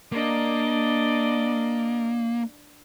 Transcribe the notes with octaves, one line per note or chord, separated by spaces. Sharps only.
A#3 D4 D5 D#5